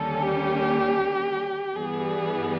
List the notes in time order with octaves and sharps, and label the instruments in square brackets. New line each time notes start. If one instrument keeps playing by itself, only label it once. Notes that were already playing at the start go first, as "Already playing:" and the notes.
Already playing: [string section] D#2 D3 G3 A#3 C#4 [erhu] A4
[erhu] G4
[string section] G2 E3 G3 B3 [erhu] G#4